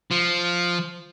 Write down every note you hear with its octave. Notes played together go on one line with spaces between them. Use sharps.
F3